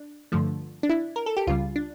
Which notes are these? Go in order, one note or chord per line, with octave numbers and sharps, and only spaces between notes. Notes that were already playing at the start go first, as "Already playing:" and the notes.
Already playing: D4
G2 D3 F3 A3
D4
E4
A#4
A4
G4
C#2 C#3 G3 F4
D4